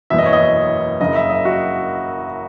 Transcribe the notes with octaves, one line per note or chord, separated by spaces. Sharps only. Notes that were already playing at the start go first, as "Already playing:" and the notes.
F#1 E2 B2 E5
D#5
C#5
D#5
F#1 F#2 C#3 D#5
E5
D#5
F#4